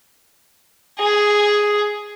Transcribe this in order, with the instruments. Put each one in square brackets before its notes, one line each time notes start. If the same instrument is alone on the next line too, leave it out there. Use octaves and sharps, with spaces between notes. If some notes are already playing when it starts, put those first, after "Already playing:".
[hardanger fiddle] G#4